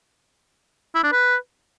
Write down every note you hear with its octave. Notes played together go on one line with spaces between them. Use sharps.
E4
D4
B4